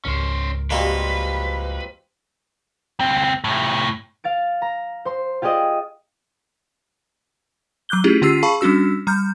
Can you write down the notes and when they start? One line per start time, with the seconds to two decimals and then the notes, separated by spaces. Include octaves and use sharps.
0.05 G#1 C#2 G#2 C#4 A#4 C5
0.70 F3 G3 G#3 A#3 C4 F#4 B4
3.01 C#2 C4
3.44 A2 C3
4.24 F5 A6 D7
4.62 A#5
5.05 C5 C6
5.42 F4 G4 G#4 D5 D#5
7.89 F#3 D6 F#6 G6 G7
8.04 A3 C#4 E4 F4 G4 G#4
8.22 D3 C#4 F4 G4 E6 C7
8.43 G#4 F5 A5 B5 C#6
8.61 G3 C#4 D4 F#4 E6
9.07 G3 A#5 F6 G6